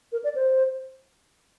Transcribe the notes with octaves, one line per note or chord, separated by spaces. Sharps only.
A#4
D5
C5